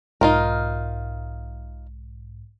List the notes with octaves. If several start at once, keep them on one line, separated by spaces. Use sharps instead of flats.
B1 G#2 D#4 F4 A#4